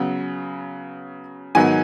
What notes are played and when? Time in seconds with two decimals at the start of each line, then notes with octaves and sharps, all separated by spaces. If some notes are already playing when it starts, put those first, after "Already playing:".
Already playing: C#3 F#3 B3
1.55 G#2 D#3 F#3 B3 G#5